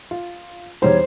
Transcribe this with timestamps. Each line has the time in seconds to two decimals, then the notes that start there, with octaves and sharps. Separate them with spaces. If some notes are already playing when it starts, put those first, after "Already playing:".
0.11 F4
0.82 E2 G3 D#4 C5 C#5